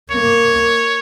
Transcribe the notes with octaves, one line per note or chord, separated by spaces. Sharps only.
A#3 C#5